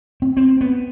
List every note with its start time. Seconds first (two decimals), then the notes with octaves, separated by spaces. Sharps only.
0.22 C4
0.37 C4
0.61 B3